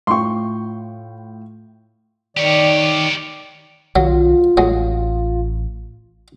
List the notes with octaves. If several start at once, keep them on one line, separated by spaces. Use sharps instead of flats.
A2 F4 G5 C6 C#6
D#3 G4 C#5 D5
B1 D#3 F#3 F4
A1 F#3 G#3